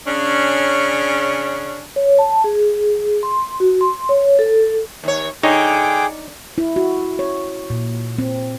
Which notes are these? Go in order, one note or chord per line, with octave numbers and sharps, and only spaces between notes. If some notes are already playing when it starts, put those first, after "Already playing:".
C#3 C#4 D4
C#5
A5
G#4
C6
F#4
C6
C#5
A4
D#2 C#5
D3 D#4 G#4 C#5 G5 D6
E4
F#4
C#5
A#2
C4